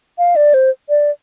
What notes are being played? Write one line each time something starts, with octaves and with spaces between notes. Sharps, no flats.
F5
D5
C5
D5